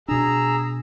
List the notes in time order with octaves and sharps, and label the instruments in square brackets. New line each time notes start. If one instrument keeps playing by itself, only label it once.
[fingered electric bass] B2 D4 [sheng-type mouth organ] G#4 A#5 E6